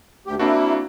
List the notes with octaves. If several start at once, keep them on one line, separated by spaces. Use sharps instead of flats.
D2 G4
A#3 C4 D4 E4 F#4